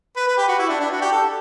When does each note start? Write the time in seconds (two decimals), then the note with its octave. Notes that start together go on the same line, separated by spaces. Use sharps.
0.16 B4
0.27 B4
0.37 G4
0.48 F#4
0.59 E4
0.69 D4
0.80 D4
0.91 F#4
1.01 G4
1.12 A4